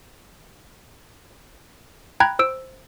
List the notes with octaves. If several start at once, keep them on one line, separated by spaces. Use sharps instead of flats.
G5 A#5 B5 F#6 G#6
C5 E6 D7